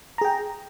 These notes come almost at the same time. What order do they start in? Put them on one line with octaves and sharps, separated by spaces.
A#5 G#4 G5